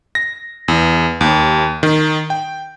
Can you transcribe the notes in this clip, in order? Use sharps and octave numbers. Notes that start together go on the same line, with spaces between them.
A#6
E2
D#2
D#3
G5